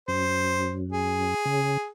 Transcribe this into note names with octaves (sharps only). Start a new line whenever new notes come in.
F#2 C5
G#4
C#3